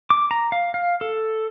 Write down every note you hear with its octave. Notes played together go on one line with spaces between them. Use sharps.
D6
A#5
F5
F5
A4